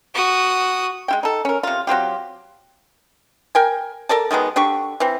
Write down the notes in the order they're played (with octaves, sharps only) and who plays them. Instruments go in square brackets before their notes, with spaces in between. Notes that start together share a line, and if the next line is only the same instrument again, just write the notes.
[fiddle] F#4 D#6
[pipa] G#3 E4 G5
D#4 A4
C#4 A#4
C3 F4
F#3 C4 F4 G4
A#4 G5 G#5
A4 A#4 D5 A5
D#3 F#3 G#3 B3
D3 D4 G4 C#6
E3 C4